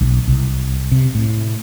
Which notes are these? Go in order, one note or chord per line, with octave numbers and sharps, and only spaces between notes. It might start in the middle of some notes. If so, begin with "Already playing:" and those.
B1
C2
C3
A2